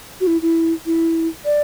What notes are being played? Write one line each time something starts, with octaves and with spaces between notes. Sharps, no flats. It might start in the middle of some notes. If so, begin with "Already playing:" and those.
F#4
E4
E4
E4
D5